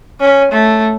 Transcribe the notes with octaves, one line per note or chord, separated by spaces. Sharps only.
C#4
A3